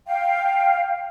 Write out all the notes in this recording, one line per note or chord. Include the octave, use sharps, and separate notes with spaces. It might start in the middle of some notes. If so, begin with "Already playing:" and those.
F5 G5